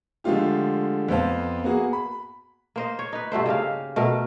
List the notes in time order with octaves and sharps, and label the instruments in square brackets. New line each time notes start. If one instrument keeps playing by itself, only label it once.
[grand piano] D3 F3 G#3 A3 F4 G4
F2 B3 C5 F5 A5
A#3 B3 F#4 G#4
B5
[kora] A#3 C5 D#5
C#5
D#4 B4
G2 B2 A3 C5
C#3 A#3 G4 F5
B2 A3 A#4